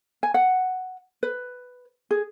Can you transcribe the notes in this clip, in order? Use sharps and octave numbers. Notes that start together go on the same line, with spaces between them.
G#5
F#5
B4
G#4